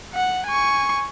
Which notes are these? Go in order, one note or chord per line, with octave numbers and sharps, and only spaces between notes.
F#5
G#5 C#6